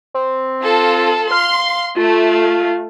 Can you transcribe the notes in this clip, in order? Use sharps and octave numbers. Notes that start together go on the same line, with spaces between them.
C4
F4 A4
F5 C6
A3 F4